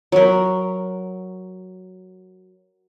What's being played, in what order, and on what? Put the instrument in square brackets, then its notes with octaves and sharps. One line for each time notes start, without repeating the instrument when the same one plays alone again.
[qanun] F#3 A#4